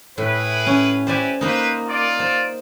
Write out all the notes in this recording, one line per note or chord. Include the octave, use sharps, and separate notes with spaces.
A2 E4 G#4 B4
C#4
E4 G4 B4 C5 D5 G#5
A#3 D#4 B4 C5
F4 D5
C5